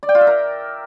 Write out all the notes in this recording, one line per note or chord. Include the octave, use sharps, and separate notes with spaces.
D5
G5
F4
E5
A#4